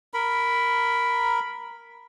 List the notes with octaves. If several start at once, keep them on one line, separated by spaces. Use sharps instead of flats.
A#4 B5